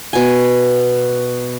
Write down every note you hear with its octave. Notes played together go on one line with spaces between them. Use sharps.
B2 G#5